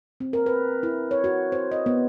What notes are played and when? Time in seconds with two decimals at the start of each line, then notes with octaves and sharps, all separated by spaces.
0.20 C4
0.33 A#4
0.46 B4
0.83 E4
1.11 C#5
1.24 F#4
1.52 C5
1.72 D#5
1.86 B3